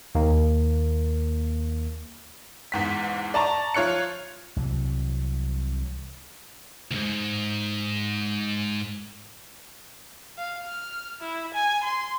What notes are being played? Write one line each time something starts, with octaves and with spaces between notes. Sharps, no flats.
D#2 A#3
E2 G#2 B6
D5 A5 A#5 C#6
F3 F4 C#5 F#6 C#7
C2 C3 E3 F#3
D2 G#2
F5
F6
E4
G#5
C6